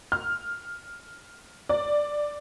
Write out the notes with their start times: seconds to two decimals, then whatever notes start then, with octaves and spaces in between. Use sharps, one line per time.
0.12 F6
1.69 D5